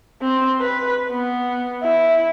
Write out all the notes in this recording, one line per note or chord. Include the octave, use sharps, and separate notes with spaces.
C4
B4
B3
E4